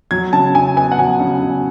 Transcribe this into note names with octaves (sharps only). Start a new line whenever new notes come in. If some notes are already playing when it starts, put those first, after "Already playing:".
F#3 G#6
C#3 A5
C#3 G#5
B3 G#5
F#5
F#3 G#5
C#3
C#3